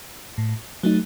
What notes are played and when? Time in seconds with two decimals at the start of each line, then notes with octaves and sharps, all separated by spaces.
0.38 A2
0.83 F#3 A3 D#4